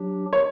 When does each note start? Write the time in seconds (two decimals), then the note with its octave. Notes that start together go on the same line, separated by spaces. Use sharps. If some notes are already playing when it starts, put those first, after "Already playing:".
Already playing: F#3 D4 G4
0.33 C#5